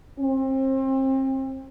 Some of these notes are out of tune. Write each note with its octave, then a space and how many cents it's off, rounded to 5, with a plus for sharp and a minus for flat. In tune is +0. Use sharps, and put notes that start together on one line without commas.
C4 +30